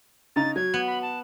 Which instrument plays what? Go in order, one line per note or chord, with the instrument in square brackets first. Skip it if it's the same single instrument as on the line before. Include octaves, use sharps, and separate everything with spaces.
[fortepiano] C#3 D#4 A#5 [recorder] A6
[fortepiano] F#3 [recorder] G#6
[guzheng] B3
[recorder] B5
A5